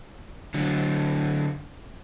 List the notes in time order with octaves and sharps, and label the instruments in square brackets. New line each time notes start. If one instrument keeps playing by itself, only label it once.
[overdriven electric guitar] D3 F#3